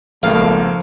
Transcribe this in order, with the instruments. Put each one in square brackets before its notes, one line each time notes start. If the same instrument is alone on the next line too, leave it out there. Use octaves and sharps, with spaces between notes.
[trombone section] G#1 A3 [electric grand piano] C#2 A#3 A4 [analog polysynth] F3 [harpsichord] F5